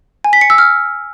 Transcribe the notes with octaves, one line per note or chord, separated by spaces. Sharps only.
G#5
B6
C#7
E6
F6